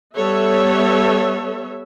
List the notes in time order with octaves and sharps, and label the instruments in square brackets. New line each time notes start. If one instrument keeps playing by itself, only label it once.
[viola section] G3 B3 A4 C#5 E5